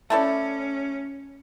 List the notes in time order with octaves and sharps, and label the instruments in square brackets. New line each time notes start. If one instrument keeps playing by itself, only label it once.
[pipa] A3 E4 A4 D5 [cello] C#4